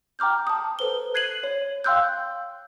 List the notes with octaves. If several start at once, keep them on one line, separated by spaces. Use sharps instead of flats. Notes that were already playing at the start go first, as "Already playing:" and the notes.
G5 A#5 D6 F6 G6
A5 D#6
A4 B4 C5 G7
F#6 G#6 C7 D#7 F#7
C#5
F5 G5 C6 E6 F#6 G6